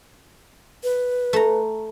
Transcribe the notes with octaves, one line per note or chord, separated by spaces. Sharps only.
B4
A3 A#5